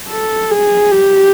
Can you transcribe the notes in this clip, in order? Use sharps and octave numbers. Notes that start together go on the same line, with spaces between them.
A4
G#4
G4